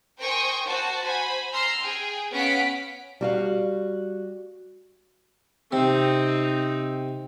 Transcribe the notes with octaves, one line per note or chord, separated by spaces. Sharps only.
A#4 C5 G5 G#5 C#6 D#6
F#4 C5 A5
C5 G#5 B5
A#5 C6 E6 F6 A#6 C7
G#4 G5
B3 C#4 F5 F#5 B6 D7
G3 F#4 F5
C3 C4 D#4